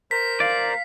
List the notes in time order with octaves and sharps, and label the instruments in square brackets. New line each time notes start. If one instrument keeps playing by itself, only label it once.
[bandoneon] A#4 C5 A#5 [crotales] B6
[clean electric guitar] D5 [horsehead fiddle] F5